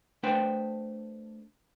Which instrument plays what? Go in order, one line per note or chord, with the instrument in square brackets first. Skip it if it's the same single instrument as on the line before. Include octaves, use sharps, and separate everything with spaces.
[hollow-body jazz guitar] A3 D4 B4 C5 G5